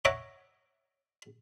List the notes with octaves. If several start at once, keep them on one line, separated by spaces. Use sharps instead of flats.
C#5 E5 F#5 A#5 D6